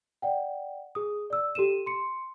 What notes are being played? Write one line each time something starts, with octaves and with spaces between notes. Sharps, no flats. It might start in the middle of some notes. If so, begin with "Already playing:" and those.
D5 F#5 G5
G#4 D#6
D5 E6
G4 A4 D#7 E7
C6 C#7